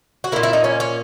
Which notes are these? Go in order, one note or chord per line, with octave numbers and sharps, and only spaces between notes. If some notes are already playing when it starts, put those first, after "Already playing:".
F#4
A#2 A#3 E4
E4
D#4
C#4
C#4